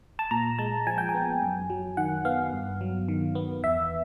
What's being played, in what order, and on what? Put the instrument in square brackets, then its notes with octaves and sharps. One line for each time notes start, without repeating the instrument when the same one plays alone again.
[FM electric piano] A5
A#2 A#5
G#3 A5
F3 G#5
G5
G#5
B3
F#2
F#3
D#3 F#5
B3 F5
G2
F#3
D#3
B3
E2 E5